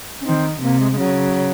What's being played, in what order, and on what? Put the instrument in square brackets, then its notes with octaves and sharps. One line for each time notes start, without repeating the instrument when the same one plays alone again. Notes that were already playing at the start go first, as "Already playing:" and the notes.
[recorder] C#4
[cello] D#3 [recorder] C4
[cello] C3 [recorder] A#3
[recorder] G#3
G#3
[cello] C#3 [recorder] F#3